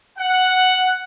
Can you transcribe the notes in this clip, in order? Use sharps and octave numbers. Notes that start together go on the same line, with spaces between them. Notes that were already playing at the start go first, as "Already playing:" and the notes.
F#5